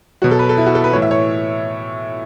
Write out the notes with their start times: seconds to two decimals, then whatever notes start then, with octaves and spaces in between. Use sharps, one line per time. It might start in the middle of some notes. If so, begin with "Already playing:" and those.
0.22 B2 F#3 F#4
0.31 A4
0.39 B4
0.49 A4
0.57 E4
0.66 F#4
0.75 A4
0.84 B4
0.93 E3 C#5
0.96 A2
1.02 E5
1.11 C#5